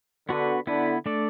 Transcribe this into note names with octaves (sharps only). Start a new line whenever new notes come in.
D3 B3 F#4 B4
D3 B3 E4 B4
A3 D4 A4 D5